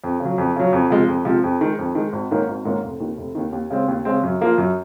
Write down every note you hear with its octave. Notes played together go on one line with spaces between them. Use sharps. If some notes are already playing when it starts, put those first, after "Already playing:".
F2
C#3
F#3
F2
C#3 F#3
F2
C3 F3 G#3
F2
C3 F3 G#3
F2
D#3 G#3
F2
D#3 G#3
G#1
G#2 D#3 A#3 C#4
G#1
G#2 D#3 A#3 C#4
F1
D#2 D#3
F1
D#2 D#3
D#2
C#3 G#3 C4
D#2
C#3 G#3 C4
F#2
F3 A#3 F4
F#2